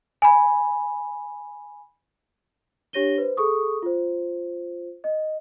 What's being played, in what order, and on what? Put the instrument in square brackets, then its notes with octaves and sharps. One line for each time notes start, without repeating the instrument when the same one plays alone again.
[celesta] G#5 B5
D4 G4 C#5 A#6 D#7 G7
B4 C5
G#4 A4 C#6 D#6
F4 C5
D#5